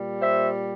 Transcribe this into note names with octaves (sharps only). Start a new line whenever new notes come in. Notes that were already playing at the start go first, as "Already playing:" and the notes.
Already playing: A#2 G3
C5 E5